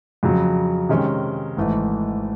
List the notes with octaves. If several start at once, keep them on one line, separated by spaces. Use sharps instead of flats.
F2 C#3 F#3
C3 D#3 G#3 C#4
G#1 G#2 E3 A3